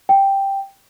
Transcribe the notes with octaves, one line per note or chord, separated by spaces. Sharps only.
G5